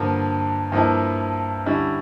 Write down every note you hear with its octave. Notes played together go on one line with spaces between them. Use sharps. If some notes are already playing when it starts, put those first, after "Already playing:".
Already playing: G2 D3 F3 A#3
G2 F3 A#3 E4
D3 G3 C#4 E4